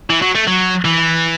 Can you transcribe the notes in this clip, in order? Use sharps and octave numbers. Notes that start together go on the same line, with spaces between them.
E3
F#3
A3
F#3
E3